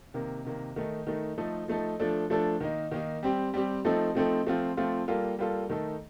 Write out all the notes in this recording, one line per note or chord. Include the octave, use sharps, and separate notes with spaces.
C3 D#3 A#3
C3 D#3 A#3
D#3 A3 D#4
D#3 A3 D#4
F3 A3 D#4 A4
F3 A3 D#4 A4
F3 A3 D4 A4
F3 A3 D4 A4
D#3 A#3 D#4
D#3 A#3 D#4
G3 C4 G4
G3 C4 G4
F3 A3 C4 D#4 A4
F3 A3 C4 D#4 A4
F3 A3 C4 F4
F3 A3 C4 F4
G3 A#3 F4 A4
G3 A#3 F4 A4
D#3 A3 D#4 A4